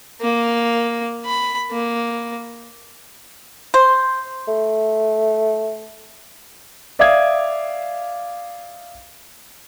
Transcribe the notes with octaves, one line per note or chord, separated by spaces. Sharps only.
A#3
B5
A#3
C5
A3
D5 E5 F5 D6 D#6 G#6